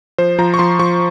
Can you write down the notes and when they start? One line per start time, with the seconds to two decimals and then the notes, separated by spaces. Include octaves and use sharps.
0.18 F3 C5
0.39 F3 A#5
0.54 C#6
0.59 F3 C6
0.79 F3 C#6